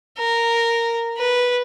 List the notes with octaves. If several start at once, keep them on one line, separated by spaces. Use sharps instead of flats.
A#4
B4